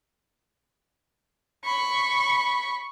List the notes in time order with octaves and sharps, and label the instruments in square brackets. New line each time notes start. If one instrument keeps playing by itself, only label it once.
[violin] B5 C#6